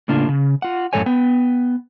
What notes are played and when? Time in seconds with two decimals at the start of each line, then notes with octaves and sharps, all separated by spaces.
0.08 A2 C#3 A#3 D4 F4
0.29 C#3
0.62 F4 F#5
0.93 F#2 A2 C#3 A4 C#5 G#5
1.06 B3 G5